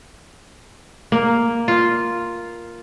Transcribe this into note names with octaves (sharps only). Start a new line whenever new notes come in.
A#3
F4